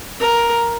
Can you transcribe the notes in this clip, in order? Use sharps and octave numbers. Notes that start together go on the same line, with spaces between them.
A#4